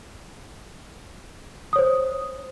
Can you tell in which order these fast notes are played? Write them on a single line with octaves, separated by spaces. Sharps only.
D#6 C#5 C5